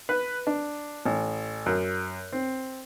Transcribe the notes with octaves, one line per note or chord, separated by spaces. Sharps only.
B4
D4
A1
F#2
C4